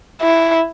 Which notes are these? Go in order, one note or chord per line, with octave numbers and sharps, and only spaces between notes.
E4